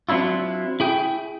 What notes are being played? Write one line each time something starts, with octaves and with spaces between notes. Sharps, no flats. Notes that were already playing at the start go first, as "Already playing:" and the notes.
F#3 C4 D4 E4 F4
E4 G#4 G5